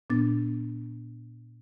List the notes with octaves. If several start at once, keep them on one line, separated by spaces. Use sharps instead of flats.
A#2 B3 D4 A6